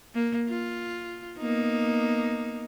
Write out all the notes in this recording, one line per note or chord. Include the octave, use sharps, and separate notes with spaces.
A#3
F4
A#3 B3 D#4